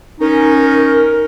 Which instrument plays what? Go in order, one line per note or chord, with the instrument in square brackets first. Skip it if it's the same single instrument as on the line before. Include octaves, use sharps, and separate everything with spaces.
[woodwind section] C#4 D#4 [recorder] A#4